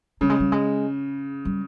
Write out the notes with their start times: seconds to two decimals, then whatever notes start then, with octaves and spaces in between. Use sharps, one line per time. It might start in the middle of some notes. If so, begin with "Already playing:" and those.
0.21 C#3 G3
0.30 G#3
0.40 G3
0.52 G#3
1.45 G3